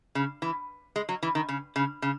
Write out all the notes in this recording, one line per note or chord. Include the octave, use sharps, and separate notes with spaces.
C#3
E3
G#3
F#3
E3
D#3
C#3
C#3
C#3